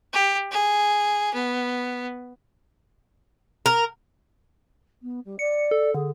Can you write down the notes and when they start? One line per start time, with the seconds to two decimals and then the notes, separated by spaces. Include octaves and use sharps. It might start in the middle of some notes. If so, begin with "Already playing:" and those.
0.13 G4
0.51 G#4
1.34 B3
3.66 A#4
5.02 B3
5.25 G3
5.39 D5 C#7
5.71 A4
5.95 D3 G#4